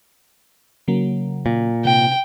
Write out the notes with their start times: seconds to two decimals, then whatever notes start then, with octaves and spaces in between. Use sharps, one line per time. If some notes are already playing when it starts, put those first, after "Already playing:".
0.88 C#3 F#3 A#3
1.46 A#2
1.85 C3 G5